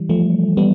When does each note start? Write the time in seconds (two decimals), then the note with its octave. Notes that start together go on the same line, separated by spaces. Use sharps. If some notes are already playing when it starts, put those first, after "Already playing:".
Already playing: E3 G3
0.09 F3 A3
0.57 G3 B3